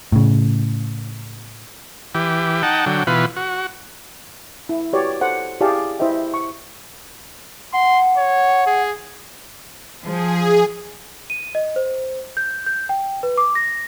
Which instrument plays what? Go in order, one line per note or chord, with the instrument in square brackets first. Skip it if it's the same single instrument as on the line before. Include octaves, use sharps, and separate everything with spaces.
[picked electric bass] A2 C#3
[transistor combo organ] E3 G4
D#4 F#5 G5 A5
D3 F#3 G5
B2 E3 F4 B4
F#4
[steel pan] E4
F#4 G4 B4 C#5 D5
A4 C5 F#5
E4 G4 G#4 D5 F5 A5
E4 C5 D#5 E5 G5
C#6
[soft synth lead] F#5 [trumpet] C6
[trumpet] C#5
G#4
[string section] F3 [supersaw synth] G#4
[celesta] D#7
D#5
C5
G6
G6
G5
B4
D6
A#6